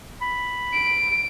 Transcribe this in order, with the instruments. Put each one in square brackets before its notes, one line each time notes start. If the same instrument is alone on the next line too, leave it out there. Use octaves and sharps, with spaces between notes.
[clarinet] B5
[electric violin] D7